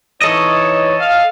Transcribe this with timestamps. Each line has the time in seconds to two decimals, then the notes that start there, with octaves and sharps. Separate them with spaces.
0.22 E3 D#4 A4 C#5 D#5
1.00 F5